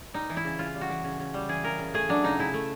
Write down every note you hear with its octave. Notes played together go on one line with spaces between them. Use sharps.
G3 D#4
E3
E4
C#3
C#3 F4
G3
F#4
E3
C#3
C#3
G3
E3 G#4
C#3 A#4
C#3
A3 G#4
F#3 D4
C#3 D#4
C#3 E4
A3